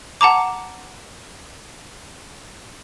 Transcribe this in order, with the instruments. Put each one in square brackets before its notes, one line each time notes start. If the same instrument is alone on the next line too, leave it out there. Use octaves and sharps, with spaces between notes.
[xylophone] F#5 A5 A#5 D6